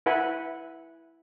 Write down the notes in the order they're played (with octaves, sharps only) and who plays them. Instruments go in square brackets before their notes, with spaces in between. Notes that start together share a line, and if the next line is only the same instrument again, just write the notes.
[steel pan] E4 B4 F#5 G#5 B5